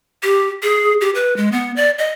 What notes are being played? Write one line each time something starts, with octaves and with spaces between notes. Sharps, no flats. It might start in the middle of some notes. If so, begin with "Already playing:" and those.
G4
G#4
G4
B4
G#3
B3
D5
D#5